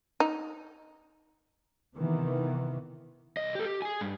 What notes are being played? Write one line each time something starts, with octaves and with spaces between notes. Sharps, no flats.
D#4
C3 D#3 E3 B3
C2 D#5
G4 A4
G4
G#4 G#5
G2